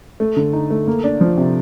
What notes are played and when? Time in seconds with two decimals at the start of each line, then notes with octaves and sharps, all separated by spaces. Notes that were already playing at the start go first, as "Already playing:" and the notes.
0.20 A3
0.36 D3
0.53 D#4
0.70 A3
0.87 A#3
1.04 D4
1.21 F3
1.37 C3